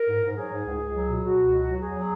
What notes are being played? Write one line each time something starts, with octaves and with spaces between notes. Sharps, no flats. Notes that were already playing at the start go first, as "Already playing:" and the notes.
Already playing: A#4
G#2
G#2
F#3 G#4
G#2
C#2
C#2
F#3
B2
B2 F#4
C#2
F#3
F#3
E2 G#4
F#3